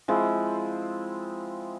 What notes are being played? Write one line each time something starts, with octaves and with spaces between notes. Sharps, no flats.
F3 G#3 C4 E4